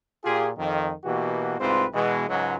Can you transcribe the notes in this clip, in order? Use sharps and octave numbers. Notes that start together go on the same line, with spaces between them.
A#2 F4 G4 G#4
F2 D#3
B2 E3 A#3 F#4 G4
C2 G#2 C4 F4 B4 C5
B2 E3 G#3
C#2 G#2 F#3